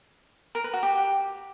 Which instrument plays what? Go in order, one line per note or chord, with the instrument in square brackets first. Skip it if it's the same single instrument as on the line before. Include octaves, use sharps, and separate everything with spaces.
[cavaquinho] A#4
B4
F#4
G4